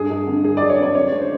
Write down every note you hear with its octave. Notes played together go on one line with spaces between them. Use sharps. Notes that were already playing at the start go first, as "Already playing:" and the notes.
Already playing: G2 G#4
G2
D3
G2 G#4
F#3 D5
C#5
D3 D5
C#3 C#5
G#3
C5